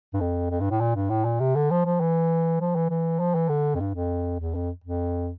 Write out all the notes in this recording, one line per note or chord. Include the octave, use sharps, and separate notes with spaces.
G2
F2
F2
G2
A2
A#2
G2
A2
A#2
C3
D3
F3
F3
E3
F3
E3
E3
F3
E3
D3
F2
G2
F2
E2
F2
F2